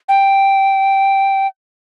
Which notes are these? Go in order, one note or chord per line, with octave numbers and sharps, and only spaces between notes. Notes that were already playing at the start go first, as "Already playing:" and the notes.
G5